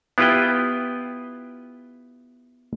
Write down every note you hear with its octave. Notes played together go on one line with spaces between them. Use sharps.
B3 E4 F4 G4 B4 G5